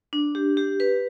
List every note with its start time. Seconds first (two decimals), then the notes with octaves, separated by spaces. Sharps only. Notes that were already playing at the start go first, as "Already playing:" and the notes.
0.13 D4
0.35 G4
0.57 G4
0.80 B4